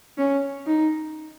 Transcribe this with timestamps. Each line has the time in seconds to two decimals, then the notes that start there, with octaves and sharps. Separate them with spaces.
0.18 C#4
0.66 D#4